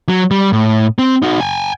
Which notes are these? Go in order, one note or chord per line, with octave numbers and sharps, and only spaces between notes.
F#3
G3
A2
C4
D#4 F#4
G5 G#5